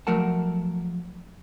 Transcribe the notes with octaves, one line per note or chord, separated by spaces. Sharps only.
F3 F#3 A3 A#4 F#5 A5